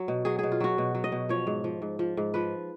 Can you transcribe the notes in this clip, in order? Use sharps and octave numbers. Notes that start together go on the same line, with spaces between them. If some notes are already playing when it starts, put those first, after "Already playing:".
Already playing: F#3
B2
F#3 G#4
B2 G#4
F4
F#3 F#4
B2
F#3
D#5
B2
F3 C#5
G#2
F3
G#2
F3
G#2
F3 B4